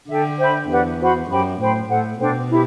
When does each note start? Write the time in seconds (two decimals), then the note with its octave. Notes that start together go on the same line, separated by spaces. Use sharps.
0.09 D3 A4 E5 G5
0.39 C5 E5 G5 B5
0.69 E2 G4 B4 D5 F#5
1.00 F#4 C5 F#5 B5
1.29 F#2 G4 C5 G5 B5
1.59 A2 C5 G5 B5
1.89 A2 A4 C5 F#5
2.19 B2 D4 A4 C5 G5
2.49 E4 G4